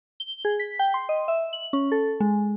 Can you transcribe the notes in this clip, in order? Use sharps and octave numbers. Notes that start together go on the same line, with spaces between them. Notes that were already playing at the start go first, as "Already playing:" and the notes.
G7
G#4
B6
G5
C6
D#5
E5
F#7
C#4
A4
G#3